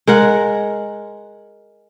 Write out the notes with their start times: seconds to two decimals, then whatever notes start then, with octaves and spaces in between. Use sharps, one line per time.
0.07 G#3 A#4 F#5